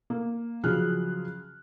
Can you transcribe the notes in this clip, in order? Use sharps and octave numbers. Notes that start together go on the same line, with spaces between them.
A#3
C#3 F3 F#3 G#4 F6 F#6